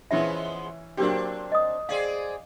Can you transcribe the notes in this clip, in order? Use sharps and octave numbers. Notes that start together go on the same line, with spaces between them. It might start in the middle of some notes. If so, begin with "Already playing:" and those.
E3 F3 G#3 B3 C#4 E4 E5
F#3 A#3 C4 D4 G4
D#5 D#6
C4 G#4 D5 F5